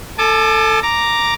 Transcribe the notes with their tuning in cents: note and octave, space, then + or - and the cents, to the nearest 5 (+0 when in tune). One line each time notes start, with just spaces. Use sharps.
A4 +15 A5 -45 D6 +35
A#5 +0 D6 +0